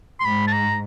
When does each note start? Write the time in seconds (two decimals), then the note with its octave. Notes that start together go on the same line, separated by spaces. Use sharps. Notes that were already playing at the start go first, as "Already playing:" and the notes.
0.20 C6
0.25 G#2 B5
0.47 A5
0.52 A#5